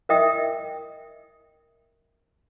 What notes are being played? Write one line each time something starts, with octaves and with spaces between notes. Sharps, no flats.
A#4 D#5 E5 G5 D#6